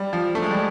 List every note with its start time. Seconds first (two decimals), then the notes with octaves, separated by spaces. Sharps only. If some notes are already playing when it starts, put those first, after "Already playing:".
Already playing: G3
0.13 F3
0.35 A3
0.42 G#3
0.51 G3